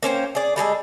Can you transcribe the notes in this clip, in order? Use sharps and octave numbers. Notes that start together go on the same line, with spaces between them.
A#3 C#4 C5 G5
G#4 D5
G3 G#3 G#4 A4